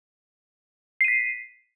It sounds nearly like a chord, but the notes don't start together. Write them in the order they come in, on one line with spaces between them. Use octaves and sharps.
C7 D#7 B6